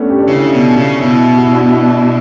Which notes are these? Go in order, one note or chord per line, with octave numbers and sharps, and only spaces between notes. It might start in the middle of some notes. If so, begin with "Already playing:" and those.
Already playing: A3 B3 C#4 D4
G4
D4
C#3 E4
B2
C#3
B2 E4
F#4
E4
D4
E4